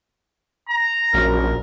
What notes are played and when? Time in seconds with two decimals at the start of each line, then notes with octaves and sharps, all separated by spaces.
0.69 A#5
1.14 A#1 F#2 A#4